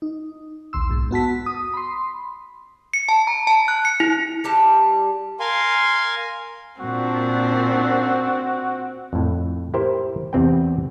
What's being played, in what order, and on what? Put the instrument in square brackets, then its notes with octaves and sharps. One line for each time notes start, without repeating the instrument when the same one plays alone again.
[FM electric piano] D#4
A#1 D#2 C6 E6
B1 G#2
B3 F#4 A5 B6
D#6
B5 C6
[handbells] C#7
A5
A#5
A5
F#6
C#7
E4
[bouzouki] G3 G4 A5
[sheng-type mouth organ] A#4 F5 G#5 C6
[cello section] A#2 D4 [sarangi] C4 [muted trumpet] F#4
[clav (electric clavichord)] F2 A2
E4 G4 A#4 C5
E2 C3 C4 B4 G5